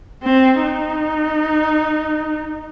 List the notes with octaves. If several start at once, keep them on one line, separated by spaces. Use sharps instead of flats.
C4
D#4